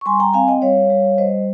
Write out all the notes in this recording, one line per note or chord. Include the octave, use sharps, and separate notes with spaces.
C#6
G3 G#5 C6
G5 A#5
C4 F5 G#5
D#5 G5
G3 C#5 F5
G3
G3 C5 D#5